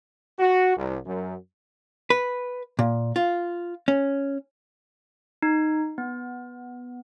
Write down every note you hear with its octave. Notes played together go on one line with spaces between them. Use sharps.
F#4
C2
F#2
B4
A#2
F4
C#4
D#4
B3